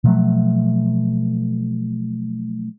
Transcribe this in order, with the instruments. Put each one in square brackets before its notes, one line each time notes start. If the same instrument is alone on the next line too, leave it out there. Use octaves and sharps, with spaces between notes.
[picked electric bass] B2 F3 F#3 A3